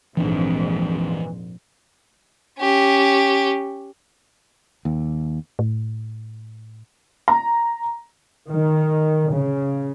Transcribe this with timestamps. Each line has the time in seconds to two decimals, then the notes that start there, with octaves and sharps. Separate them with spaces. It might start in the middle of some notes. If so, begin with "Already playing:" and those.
0.17 A#1 F2 G#2 E3 C4 D4
2.59 C#4 G4
4.85 D#2
5.59 A2
7.28 A#5
8.50 D#3
9.32 C#3